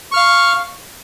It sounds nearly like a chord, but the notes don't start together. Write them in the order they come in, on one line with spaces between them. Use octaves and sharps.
C#6 F6 F5